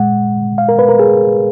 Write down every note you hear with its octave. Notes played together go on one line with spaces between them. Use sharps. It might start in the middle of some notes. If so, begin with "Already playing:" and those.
Already playing: A#2 G#3 F#5
F5
A#4
B4
A#4
G#4